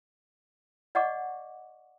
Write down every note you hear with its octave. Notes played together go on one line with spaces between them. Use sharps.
D5 D#5 F#5 C#6 D6